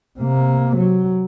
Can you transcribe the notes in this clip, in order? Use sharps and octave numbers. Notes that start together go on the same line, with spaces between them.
C3 A#3
F#3